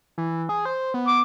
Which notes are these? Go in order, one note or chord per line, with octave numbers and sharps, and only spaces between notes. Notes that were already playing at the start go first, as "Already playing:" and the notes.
E3
G#4
C5
B3
D6